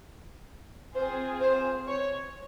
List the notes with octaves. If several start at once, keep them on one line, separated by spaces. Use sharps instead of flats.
C4 F4 G#4 C5
C5
C#5